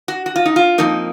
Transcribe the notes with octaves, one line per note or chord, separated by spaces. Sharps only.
F#4
F#4
F4
D#4
F4
F2 F3 A#3 D#4